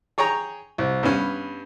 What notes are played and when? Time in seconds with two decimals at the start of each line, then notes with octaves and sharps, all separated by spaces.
0.18 G#4 C#5 G5 A#5
0.78 C2
1.03 G2 B3 C#4